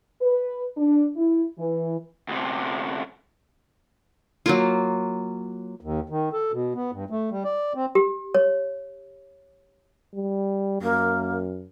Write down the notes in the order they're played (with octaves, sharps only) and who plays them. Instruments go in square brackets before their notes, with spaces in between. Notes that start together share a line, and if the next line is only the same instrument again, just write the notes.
[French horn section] B4
D4
E4
E3
[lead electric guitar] D2 C3
[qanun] F#3 A#3 F4
[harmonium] D#2
D#3
A4
B2
B3
G2
A3
G3
D5
C4
[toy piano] G4
C#5
[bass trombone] G3
[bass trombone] F#2 [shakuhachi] A#3